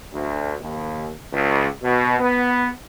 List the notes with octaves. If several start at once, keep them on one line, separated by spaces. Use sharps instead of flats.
D2
D#2
C#2
B2
B3